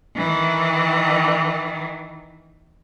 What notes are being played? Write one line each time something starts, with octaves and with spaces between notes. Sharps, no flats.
D#3 E3